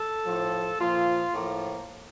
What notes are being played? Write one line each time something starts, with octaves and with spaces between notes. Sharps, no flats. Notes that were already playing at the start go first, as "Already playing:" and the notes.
Already playing: A4
A2 F3
A#2 F3 F4
A2 F3 A#3